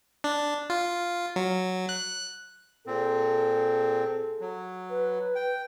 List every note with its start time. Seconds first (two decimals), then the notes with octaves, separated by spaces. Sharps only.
0.24 D4
0.70 F4
1.36 F#3
1.89 F#6
2.87 A#2 C4 G#4 A4
4.41 F#3
4.90 B4
5.35 G5